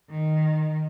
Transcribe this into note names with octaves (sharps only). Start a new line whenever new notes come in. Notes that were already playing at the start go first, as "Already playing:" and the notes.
D#3